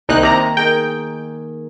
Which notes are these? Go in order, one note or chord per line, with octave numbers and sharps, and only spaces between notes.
C2 D#3 A#3 D#4 G5 F#6
C3 A#5
D#4 G#4 A#4 G5